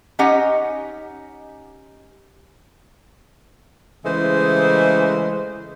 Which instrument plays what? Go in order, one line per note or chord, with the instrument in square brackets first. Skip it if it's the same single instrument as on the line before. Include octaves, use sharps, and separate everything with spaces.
[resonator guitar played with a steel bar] C#4 D#4 G4 D#5 F#5
[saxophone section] C#3 E3 G#3 A3 B4 C5